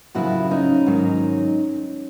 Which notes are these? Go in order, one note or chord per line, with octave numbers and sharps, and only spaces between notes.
F#2 C#3 F3 E4 F#4
C#4 D#4
G#2 D#3 F#3